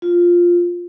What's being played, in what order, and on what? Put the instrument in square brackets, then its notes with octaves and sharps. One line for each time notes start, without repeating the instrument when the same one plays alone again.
[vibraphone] F4